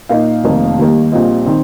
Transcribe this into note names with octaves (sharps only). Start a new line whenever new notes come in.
A#2 A#3 D#4 F5
F1 F2 D#3 A#3 D#4
D#2 D#3 G3 A#3 D#4
A#1 A#2 G3 C4 F4 D#5
D#3 C4